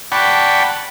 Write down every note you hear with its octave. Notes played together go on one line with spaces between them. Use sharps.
D5 F#5 G5 A5 B5 C#6